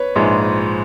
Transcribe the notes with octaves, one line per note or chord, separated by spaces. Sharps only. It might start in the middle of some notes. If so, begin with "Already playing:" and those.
Already playing: B4 C#5
A#1 G#2 F3 G#3